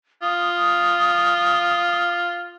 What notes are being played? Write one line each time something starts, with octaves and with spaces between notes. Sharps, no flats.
F4 D#6